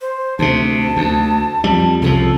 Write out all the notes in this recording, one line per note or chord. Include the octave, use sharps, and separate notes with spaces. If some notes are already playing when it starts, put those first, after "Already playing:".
C5
D2 C3 A5
D2
F2 G3
C2 C#3 F3 A4